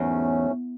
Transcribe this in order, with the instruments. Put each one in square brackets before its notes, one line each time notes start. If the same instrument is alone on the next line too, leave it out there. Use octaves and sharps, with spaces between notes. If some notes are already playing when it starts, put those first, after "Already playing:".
Already playing: [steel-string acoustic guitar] E2 [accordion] G#2 F#3 A3 C#4